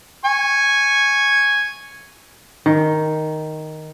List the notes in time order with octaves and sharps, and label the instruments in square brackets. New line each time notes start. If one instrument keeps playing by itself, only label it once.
[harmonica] G#5 C#6
[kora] D#3